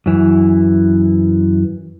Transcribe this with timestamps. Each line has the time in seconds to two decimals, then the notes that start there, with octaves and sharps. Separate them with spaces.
0.06 F#2 E3